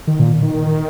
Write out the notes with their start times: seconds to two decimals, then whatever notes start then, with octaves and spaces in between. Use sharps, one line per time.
0.07 D#3
0.20 A#2
0.42 D#3